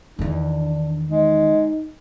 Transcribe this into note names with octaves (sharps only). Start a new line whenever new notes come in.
E2 D#3 D4
G#3 D#4